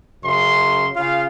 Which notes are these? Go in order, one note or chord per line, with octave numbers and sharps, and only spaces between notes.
F#2 C#3 C6
C#3 F4 F5